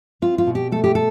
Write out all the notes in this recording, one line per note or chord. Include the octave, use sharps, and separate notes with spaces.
C4 F4
F4
B2
G4
A3 A4
G4
A4